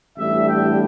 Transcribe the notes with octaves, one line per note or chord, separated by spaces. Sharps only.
A1 A2 G3 B3 D4 E5
G5